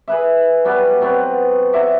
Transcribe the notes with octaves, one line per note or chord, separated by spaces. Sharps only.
G#4 B4 E5
F#3 G3 B3
B2 F#3 B3 C4
D5 E5 F#5 A#5